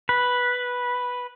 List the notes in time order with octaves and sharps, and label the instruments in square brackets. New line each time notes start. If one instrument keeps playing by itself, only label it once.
[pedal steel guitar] B4